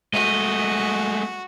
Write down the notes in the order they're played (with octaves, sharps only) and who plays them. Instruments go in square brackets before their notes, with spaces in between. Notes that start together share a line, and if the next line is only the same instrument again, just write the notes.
[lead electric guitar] G#3 A3 [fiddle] F#4 [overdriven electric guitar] D#5